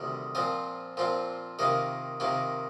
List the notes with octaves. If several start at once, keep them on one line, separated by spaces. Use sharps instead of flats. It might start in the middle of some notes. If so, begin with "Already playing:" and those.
Already playing: D2 C3 D#3 G3
A#2 F3 C4 F4 D#5
A#2 F3 C4 F4
C3 D#3 A#3 F4 D#5
C3 D#3 A#3 F4